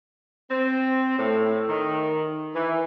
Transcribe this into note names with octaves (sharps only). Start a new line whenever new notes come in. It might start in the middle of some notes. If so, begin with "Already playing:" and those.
C4
A2
D#3
E3